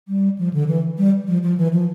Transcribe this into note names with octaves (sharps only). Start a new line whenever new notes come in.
G3
F3
D3
E3
G3
F3
F3
E3
F3